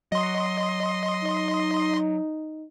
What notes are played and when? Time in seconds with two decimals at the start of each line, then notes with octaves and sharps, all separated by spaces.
0.12 F#3 D#5 C6
1.23 D#4